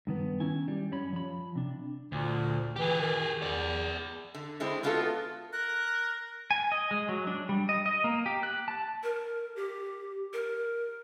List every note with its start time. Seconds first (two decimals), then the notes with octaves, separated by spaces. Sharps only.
0.07 G2 D#3 B3
0.40 D#3 C#4 E4 G#5
0.68 G3 G4
0.91 F#2 C#4 B5
1.13 F3 B5
1.55 C3 D4
2.12 D2 A#2
2.76 E3 G4 G#4
3.01 D#3
3.42 E2 G#4 D5
4.35 D3
4.60 D3 G#3 C4 E4
4.83 G#3 B3 F4 F#4 G#4 A4
5.53 A#4 F#6
6.51 G#5
6.72 D#5
6.91 G#3
7.09 F#3
7.27 D4
7.49 G3
7.69 D#5
7.86 D#5
8.04 A#3
8.26 G4
8.43 F#6
8.68 A5
9.03 A#4
9.56 G4
10.33 A#4